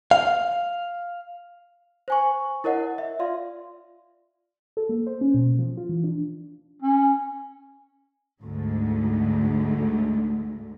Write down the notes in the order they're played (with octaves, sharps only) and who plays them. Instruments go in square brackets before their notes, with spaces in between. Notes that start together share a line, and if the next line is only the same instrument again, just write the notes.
[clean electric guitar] F5
[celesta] C5 G#5 C#6
E4 A#4 C#5 D#5 F#5
E5
F4 D5 F5 C6
[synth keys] A4
A#3
C5
C#4
B2
F3
F4
E3
D4
[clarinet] C#4
[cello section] D2 G#2 D3